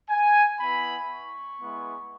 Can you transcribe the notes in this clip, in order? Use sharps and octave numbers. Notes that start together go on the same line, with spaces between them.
G#5
B3 E4 B5
C#6
G#3 B3 E4